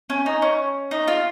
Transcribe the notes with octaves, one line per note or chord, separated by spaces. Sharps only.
C#4
D#4
C#4
D#4
F4